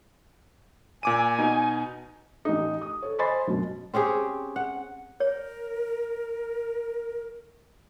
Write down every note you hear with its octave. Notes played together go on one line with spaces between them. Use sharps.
A#2 G#5 D6 D#7
B2 D#4
A1 D#4
D#6
A4 C#5
C5 D#5 G#5 B5 C6 A6
F#2 B2
C4 C#4 G4 G#4
F#5
A#4 C#5